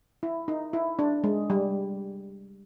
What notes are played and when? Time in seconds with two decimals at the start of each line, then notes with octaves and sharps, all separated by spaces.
0.23 E4
0.48 D#4
0.73 E4
0.99 D4
1.24 G#3
1.50 G3